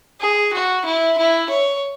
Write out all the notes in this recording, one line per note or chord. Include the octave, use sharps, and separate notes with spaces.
G#4
F#4
E4
E4
C#5